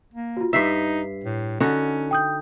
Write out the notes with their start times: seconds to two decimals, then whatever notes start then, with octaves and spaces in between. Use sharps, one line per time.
0.14 A#3
0.37 F4 F#4
0.53 G2 D#4 E5 B6 C7
1.24 A2
1.60 D3 C#4 D#4 F#4
2.11 G5 D#6 G6